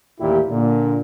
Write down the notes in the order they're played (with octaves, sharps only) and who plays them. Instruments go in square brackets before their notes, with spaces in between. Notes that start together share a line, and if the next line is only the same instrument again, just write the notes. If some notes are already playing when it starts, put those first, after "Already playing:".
[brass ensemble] A1 D#2 A#2 E4 G4
A#2 D3